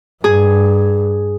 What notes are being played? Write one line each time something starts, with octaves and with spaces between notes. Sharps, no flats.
G2 G#4